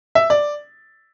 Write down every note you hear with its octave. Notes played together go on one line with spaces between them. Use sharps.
E5
D5